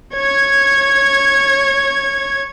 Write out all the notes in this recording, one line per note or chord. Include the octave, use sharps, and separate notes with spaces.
C#5 G#6